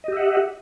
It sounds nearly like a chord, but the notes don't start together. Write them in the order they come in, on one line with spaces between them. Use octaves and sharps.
D#5 G4 E5 F#5